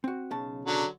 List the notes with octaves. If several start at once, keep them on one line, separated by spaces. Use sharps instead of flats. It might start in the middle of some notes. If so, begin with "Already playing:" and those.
C4 F#4
B1 C#3 A5
D3 F#3